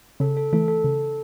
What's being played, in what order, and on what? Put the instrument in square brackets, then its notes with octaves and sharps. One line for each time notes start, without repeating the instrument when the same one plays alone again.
[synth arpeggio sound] C#3 [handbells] A4
[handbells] A4
[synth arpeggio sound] E3 A3 [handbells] A4
[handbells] A4
[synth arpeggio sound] C#3